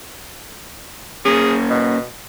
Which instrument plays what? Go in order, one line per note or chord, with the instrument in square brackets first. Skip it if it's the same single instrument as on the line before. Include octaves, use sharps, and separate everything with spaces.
[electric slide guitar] A#3 C#4 [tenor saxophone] G#4
[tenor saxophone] B2